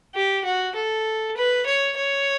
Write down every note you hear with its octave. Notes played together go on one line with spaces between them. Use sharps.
G4
F#4
A4
B4
C#5
C#5